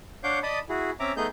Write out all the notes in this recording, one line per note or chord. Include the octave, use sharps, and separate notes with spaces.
D4 C#5 F5 F#5 D6 G6
D5 D#5 A5 B5 D#6
E4 F#4 G#4
C4 C#4 E5 A#5 D6
A3 B3 D#4 G#4 D#5 G6